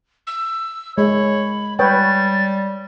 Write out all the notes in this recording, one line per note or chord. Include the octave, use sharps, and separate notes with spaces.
E6
G#3 C#5 B5
G3 B4 C#5 G5 A6